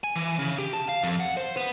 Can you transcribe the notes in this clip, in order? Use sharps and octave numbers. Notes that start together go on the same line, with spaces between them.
G#5
E3
C#3
G4
A5
F5
F2
F#5
C5
B3